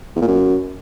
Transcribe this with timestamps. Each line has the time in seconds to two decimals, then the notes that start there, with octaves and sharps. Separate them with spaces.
0.16 E2
0.22 A#2
0.27 F#2